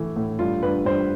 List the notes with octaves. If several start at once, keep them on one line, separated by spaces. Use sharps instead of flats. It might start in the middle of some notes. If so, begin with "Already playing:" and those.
Already playing: E3 A3
A2
G2 F4
G2 B4
G2 C5